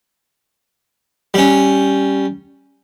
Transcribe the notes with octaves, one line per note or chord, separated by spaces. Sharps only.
G3 C#4